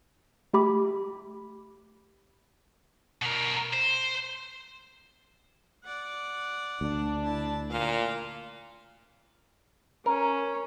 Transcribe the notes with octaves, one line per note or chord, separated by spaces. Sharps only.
A3 G4 B5 D6
B2 A#4
C5
D5 F#5
D2 D4
E4 A5
A#2 F5
C#4 A#4